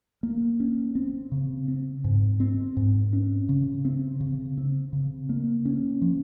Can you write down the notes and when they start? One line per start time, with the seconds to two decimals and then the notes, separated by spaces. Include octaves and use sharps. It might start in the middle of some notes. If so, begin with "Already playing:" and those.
0.23 A#3
0.60 C#4
0.95 C4
1.32 C#3
1.68 C4
2.04 G#2
2.40 C4
2.77 G#2
3.13 C#4
3.49 C#3
3.85 C4
4.20 C#3
4.58 C4
4.93 C#3
5.29 A#3
5.65 C#4
6.02 F3